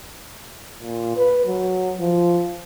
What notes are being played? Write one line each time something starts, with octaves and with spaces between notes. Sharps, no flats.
A#2
B4
F#3
F3